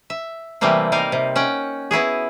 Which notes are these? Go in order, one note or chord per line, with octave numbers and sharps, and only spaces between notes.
E5
C3 E3 G3 A3 A#3 C4
G3 D#4 A#4 F5
C3
C#4 F#5 G5
B3 E4 F#4 G#4